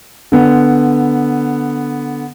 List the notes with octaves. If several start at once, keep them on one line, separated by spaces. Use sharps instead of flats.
D3 B3